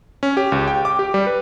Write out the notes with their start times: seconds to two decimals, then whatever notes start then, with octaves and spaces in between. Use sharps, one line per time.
0.23 C#4
0.37 G4
0.52 C#2
0.67 G5
0.85 D6
0.99 G4
1.14 G3
1.27 B4